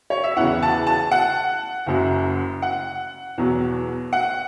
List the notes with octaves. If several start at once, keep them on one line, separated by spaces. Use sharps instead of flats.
C#5
E5
E2 C#3 E3 F#5
A5
A5
F#5
F#1 F#2 F#3
F#5
E2 B2 F#3
F#5